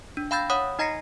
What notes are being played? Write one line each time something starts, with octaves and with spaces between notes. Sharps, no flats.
D4
F5 G5 B5 E6 G6 A6
C#5 F#5 B5 D#6
D#4 D#5 A#5 A#6 C7 C#7